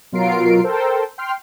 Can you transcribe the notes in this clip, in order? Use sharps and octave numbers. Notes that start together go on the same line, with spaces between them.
B2 F#3 F4 A#4 C7 D7
A4 A#4 C5 G5
G5 C6 F6 C7